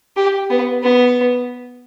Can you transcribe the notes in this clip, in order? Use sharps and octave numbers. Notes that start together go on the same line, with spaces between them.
G4
B3
B3